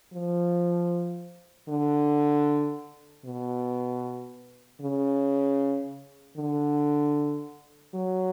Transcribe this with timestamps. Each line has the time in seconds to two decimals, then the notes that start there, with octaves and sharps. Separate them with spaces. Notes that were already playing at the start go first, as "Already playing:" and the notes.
0.13 F3
1.69 D3
3.25 B2
4.81 C#3
6.37 D3
7.93 F#3